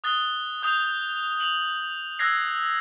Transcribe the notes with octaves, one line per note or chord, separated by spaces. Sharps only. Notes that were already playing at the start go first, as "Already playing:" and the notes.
D#6 F#6 A6 G7
D#6 G6 F7
F7 F#7
E6 F#6 G#6 A#6 C7